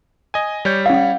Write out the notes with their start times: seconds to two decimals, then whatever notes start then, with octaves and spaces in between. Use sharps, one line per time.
0.34 D#5 G#5
0.65 G3 C#5 G6
0.86 C#4 F5